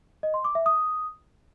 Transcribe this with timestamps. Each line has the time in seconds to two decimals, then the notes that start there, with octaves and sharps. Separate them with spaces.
0.23 D#5
0.34 C6
0.45 D6
0.55 E5
0.66 D#6